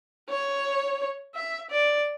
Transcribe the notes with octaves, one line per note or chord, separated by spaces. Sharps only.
C#5
E5
D5